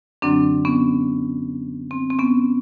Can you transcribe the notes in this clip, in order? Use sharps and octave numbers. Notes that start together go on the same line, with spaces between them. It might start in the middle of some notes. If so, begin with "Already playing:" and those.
F#2 D3 F#3 C4 D4
B3 C#4
C4
C4
B3 C#4